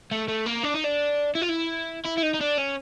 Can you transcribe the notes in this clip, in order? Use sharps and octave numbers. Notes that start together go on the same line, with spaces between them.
A3
A3
A#3
D4
D#4
D4
E4
F4
E4
E4
E4
D#4
D#4
D4
C#4